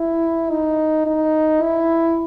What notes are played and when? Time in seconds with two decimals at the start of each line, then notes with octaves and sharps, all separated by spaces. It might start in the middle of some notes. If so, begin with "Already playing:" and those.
Already playing: E4
0.50 D#4
1.06 D#4
1.62 E4